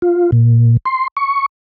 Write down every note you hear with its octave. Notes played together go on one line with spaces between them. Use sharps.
F4
A#2
C6
C#6